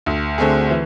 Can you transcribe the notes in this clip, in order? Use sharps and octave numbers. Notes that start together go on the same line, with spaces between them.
D2
D3 A3 C4 G#4
E3